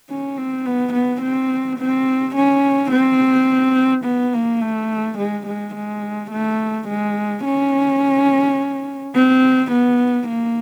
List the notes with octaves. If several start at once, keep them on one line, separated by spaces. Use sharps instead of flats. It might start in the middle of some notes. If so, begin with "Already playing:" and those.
C#4
C4
B3
B3
C4
C4
C#4
C4
B3
A#3
A3
G#3
G#3
G#3
A3
G#3
C#4
C4
B3
A#3